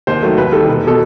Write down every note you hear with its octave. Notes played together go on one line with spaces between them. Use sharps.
D#2 C5
D#3 F#3 A3
D#2 B4
D#3 G3 A4
E1
B2 A4